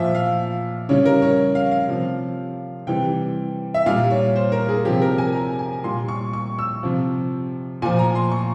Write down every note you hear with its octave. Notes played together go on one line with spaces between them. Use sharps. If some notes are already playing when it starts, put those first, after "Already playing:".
Already playing: A#2 F3 E5
F5
C#3 G3 C#5
A#4
C#5
F5
F5
C3 F3
C3 E3 G3 G5
E5
A#2 G3 F5
C#5
C5
A#4
G#4
C3 F3 G4
A#4
G#5
A#5
G#5
A#2 G3 C6
C#6
C#6
E6
C3 F3
A#2 F3 G#5
A#5
C6
C#6